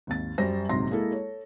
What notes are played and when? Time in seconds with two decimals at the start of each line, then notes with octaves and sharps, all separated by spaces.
0.07 G#1 D#2 A6
0.38 F#2 G3 C5 A#6
0.69 A#1 G#2 C3 F#3 C6 A#6
0.91 G#3 A#3 E4 A4
1.12 A4 C#5